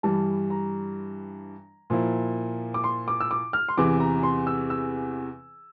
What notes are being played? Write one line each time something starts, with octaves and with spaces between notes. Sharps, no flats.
G2 E3 G3 A5
A#5
A#2 F3 A#3 E4
D6
C6
D6
E6
D6
F6
C6
E2 C3 E3 D6
A#5
C6
E6
E6